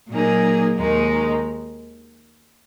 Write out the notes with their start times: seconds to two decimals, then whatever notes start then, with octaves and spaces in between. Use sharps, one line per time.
0.10 A#2 F#3 A#3 D#4 G#4
0.77 D#2 D#3 G#3 D#4